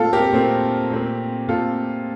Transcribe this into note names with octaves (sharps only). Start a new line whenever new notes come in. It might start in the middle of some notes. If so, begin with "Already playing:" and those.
Already playing: A#2 A3 C4 F4 A4
G4 A#4
A#2 A3 C4
A#2 A3 C4
A#2 A3 C4 F4 A4